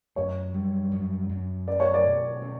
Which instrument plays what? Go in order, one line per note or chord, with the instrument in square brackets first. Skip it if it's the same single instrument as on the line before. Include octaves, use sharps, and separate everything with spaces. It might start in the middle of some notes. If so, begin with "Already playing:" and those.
[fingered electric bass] F#2 [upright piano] C#5
[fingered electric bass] G3
F#2
F#2
[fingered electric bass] C#4 [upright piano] D5
[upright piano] C#5
D5
[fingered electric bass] B2
C#4